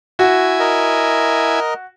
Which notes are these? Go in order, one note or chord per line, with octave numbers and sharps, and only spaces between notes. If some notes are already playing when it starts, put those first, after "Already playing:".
E4 F#4 G#5
A#4 D#5